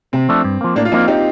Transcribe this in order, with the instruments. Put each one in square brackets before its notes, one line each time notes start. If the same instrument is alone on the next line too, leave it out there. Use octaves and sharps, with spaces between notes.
[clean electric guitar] C3 [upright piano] C4
[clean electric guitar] F3 A3 D4
G2
F3 A#3
[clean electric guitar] A2 [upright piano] A#3 D4
[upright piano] F4
[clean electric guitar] F3 A#3 [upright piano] C4 D#4
[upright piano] D#4 G4